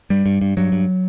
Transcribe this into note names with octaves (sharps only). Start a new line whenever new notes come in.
G2 G3
G2
G2
G2 F#3
G2